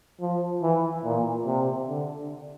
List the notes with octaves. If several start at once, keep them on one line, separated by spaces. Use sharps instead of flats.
F3
E3
A#2
C3
D3